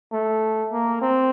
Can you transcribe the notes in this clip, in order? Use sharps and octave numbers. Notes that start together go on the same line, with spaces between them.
A3
A#3
C4